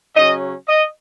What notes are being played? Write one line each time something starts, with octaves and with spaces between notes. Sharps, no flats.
C#3 F#3 C#4 D#5
D#5